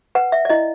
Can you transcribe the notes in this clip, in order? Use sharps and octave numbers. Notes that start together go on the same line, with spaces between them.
B4 F#5
E5
D5
E4 D#5